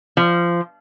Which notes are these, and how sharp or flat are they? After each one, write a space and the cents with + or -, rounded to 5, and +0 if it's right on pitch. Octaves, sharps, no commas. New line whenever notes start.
F3 -20